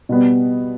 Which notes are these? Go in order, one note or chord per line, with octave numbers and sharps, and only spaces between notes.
B2 G3 B3